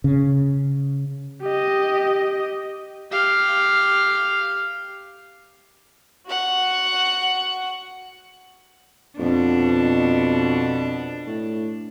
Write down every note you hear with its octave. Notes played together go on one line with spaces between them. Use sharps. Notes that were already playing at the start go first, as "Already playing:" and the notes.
C#3
G4 D#5
G4 F5
F#4 F#5
F2 B2 D4
A2